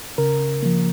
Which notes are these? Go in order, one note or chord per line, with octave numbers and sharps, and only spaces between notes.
C#3 A#4
F3 A#3